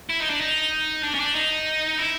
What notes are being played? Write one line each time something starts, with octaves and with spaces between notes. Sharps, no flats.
E4
D#4
D4
D#4
D4
C#4
D4
D#4
E4